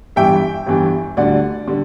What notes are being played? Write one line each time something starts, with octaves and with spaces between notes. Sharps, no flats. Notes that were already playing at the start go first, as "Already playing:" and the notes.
G1 G2 E3 G3 E5 G5
G1 G2 E3 G3
D2 D3 G3 D5 F#5
D3 G3